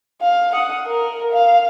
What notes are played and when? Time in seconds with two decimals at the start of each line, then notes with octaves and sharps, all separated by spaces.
0.22 F5
0.54 F#5 D#6
0.87 A#4
1.33 F5